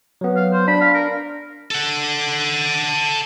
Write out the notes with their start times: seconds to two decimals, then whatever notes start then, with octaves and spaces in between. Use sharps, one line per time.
0.21 F#3 B3
0.36 F5
0.53 C5
0.68 D4 B5
0.81 F5
0.94 A#4
1.71 A4 F#5